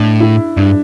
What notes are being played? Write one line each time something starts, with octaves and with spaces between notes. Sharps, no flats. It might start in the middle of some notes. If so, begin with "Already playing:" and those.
Already playing: A2 D4
E4
G2 D4